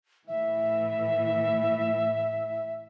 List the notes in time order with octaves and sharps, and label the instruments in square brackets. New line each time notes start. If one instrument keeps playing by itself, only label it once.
[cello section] A2 E3 [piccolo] E5